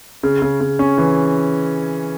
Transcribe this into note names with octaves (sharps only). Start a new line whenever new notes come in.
C#3
C#3
C#3
C#4
E3